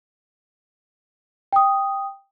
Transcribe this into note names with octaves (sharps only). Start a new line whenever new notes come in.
G5 D#6